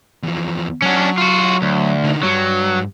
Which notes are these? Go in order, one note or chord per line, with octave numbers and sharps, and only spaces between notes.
E2 F3
F#3 C#4 D4 F#5
F4 F#4
D2
D3 D#4
G2 F#3